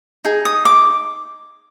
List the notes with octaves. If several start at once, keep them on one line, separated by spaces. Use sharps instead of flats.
D#4 G#4
D#6
D6